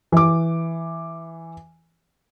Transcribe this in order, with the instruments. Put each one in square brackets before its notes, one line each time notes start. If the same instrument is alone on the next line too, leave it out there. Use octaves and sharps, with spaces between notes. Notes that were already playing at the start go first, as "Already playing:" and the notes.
[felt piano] E3 D6